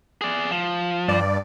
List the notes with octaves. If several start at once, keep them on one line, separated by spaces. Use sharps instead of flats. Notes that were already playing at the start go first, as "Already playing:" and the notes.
G#4 D5
F3
G2 D5